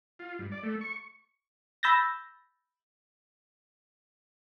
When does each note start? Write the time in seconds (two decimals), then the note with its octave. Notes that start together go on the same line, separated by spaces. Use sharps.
0.19 F4
0.39 G2
0.52 D5
0.63 A3
0.81 C#6
1.83 B5 E6 G6 A6 A#6